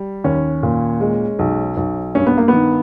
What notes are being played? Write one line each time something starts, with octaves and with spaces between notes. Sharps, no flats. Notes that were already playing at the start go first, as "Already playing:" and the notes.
Already playing: G3
D#2 C#4
A#2
G#3
B1
B1
G2 C#4
B3
A#3
D#3 B3